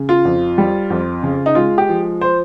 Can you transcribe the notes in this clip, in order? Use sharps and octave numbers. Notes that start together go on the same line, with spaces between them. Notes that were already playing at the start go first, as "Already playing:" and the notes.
Already playing: C#3
F4
F2
G3
F2
C#3
D#4
G#3 F4
G4
F3
C5